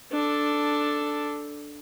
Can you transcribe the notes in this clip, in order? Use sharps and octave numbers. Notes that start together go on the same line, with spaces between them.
D4 A4